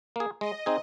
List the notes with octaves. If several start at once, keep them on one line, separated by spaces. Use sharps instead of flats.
A#3 G#4
G#3 D#5
C4 D#4 G#4